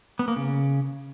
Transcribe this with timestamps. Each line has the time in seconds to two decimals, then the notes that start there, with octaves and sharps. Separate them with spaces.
0.19 B3
0.28 A#3
0.36 C#3